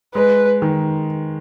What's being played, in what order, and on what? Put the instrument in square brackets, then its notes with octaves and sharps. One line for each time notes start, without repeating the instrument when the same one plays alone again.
[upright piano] G#3 [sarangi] B4
[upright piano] D#3